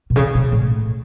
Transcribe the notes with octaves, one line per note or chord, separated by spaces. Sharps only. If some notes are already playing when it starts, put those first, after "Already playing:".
B2
C#3
B2
A2